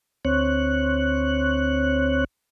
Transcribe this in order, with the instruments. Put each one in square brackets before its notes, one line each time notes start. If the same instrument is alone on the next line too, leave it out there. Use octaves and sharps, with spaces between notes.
[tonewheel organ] D2 C4 C#5 F#6